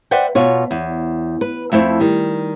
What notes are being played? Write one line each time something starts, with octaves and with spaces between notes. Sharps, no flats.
B4 C5 D5 E5 F#5 G5
B2 F4 C#5
E2
B4
F2 A3 E4 C5
D#3 G3